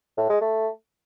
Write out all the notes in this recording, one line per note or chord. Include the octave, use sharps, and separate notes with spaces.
A2
G#3
A3